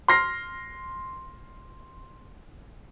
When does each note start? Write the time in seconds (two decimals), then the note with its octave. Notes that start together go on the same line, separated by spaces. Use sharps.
0.08 C6 F6 A#6 C7